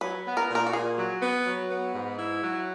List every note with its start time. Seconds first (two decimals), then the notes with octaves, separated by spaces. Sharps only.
0.01 F#3 B4
0.26 B3
0.37 A#4
0.49 A#2
0.55 A#4
0.67 F#4
0.73 A#2 G#4
0.97 F#3
1.21 B3
1.46 F#3
1.70 B3
1.93 G#2
2.17 E4
2.41 F#3